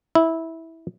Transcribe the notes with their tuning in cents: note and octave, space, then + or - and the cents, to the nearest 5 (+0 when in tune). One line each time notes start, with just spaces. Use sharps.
E4 -15